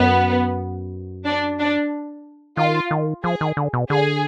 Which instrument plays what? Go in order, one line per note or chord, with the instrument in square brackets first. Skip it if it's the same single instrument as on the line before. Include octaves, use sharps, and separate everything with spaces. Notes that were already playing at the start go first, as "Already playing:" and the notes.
Already playing: [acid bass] F#2 [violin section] B3
[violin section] D4
D4
[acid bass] D#3 [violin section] F4
[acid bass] D#3
[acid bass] F3 [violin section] G#4
[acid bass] D#3
D3
B2
[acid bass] D3 [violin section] G#4